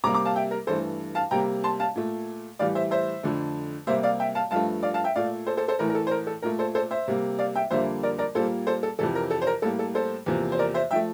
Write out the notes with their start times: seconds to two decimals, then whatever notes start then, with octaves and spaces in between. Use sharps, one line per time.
0.04 C3 G3 A#3 A#5 D6
0.14 A#5 D6
0.25 F5 A5
0.36 E5 G5
0.51 A#4
0.67 G2 E3 A3 A4 C5
1.15 F5 A5
1.31 C3 G3 A#3 G5 A#5
1.64 A5 C6
1.80 F5 A5
1.95 A#2 A3
2.59 A2 E3 G3 D5 F5
2.75 C5 E5
2.91 C5 E5
3.23 F2 D3 A3
3.87 C3 G3 A#3 C5 E5
4.03 D5 F5
4.20 E5 G5
4.35 F5 A5
4.51 G2 F3 A3 F5 A5
4.83 D5 F5
4.94 F5 A5
5.04 E5 G5
5.16 A#2 A3 D5 F5
5.47 A4 C5
5.57 A4 C5
5.68 A4 C5
5.79 A2 E3 A3 A#4
5.90 A#4
5.95 A4
6.07 C5
6.11 A#4
6.27 A4
6.42 A#2 A3 A#4
6.59 A4 C5
6.75 A4 C5
6.91 C5 E5
7.08 C3 G3 A#3
7.39 D5 F5
7.56 E5 G5
7.71 F2 D3 G3 A#3 C5 E5
8.03 A#4 D5
8.18 A#4 D5
8.35 A#2 G3 A#3 A4 C5
8.67 A4 C5
8.83 A4
8.99 F2 C3 E3 A4
9.15 A#4
9.31 A4
9.42 C5
9.47 A#4
9.62 A2 G3 A#3 A4
9.79 A4
9.95 A4 C5
10.26 E2 C3 F3 A#3
10.52 C5
10.59 A#4 D5
10.74 C5 E5
10.91 F3 A3 E5 G5